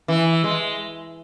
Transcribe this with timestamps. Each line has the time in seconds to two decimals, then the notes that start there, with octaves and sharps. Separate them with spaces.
0.08 E3
0.44 G#3